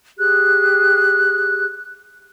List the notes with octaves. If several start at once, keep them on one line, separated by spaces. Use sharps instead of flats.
G4 G#4 F#6